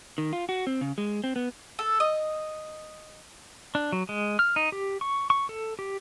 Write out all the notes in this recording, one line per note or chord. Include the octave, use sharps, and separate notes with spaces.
D#3
F4
F#4
C4
C#3
G#3
C4
B3
A4
D#5
D4
F#3
G#3
F6
D#4
G4
C#6
C#6
A4
G4